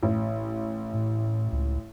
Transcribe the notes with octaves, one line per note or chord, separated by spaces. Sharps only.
A1
A2
C#2